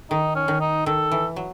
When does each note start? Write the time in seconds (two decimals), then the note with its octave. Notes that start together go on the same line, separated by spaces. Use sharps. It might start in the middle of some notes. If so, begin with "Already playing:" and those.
0.11 D#3 D#4
0.35 C#4
0.48 D#3
0.61 D#4
0.86 D#3 A4
1.11 E3
1.36 F#3